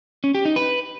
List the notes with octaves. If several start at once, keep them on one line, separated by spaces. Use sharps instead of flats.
C#4
G4
D#4
B4